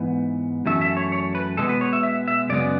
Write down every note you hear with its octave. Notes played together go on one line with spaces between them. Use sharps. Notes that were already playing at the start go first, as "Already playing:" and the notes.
Already playing: G#2 E3 B3
F#2 E3 A3 E5
E5
C#5
C#5
B4
B2 G#3 B3 A4
B4
C#5
E5
E5
E5
F#2 C#3 G#3 B3 D5